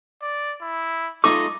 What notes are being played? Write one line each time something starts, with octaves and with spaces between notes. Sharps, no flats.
D5
E4
A3 D#4 F4 D#5 D6